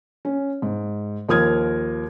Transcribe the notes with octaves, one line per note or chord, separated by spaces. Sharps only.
C#4
G#2
D#2 F3 A#4 D#6 F6 G#6